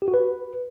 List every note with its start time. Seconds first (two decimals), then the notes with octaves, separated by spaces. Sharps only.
0.02 G4
0.08 F#4
0.14 B4